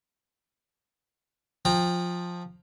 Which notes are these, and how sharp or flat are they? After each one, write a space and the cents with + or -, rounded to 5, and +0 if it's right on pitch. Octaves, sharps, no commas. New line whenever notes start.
F3 +15 G5 +25 A#5 +0